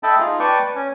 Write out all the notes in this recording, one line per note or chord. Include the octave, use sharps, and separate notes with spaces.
A4 D#5 E5 G5 A5 B5
D#4 F4 G#4
B4 D5 G5 A5 C#6 D6
B4
C#4 G#5